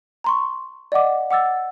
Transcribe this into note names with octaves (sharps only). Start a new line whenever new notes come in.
A#5 C6 C#6
D5 D#5 F#5 D6
F#5 D6 E6 A6